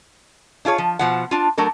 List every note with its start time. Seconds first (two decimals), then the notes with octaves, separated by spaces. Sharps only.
0.65 D4 F4 G#4 C#5
0.78 F3
0.99 B2 F3 F#5
1.31 D4 F4
1.58 F#3 A3 D4 A#4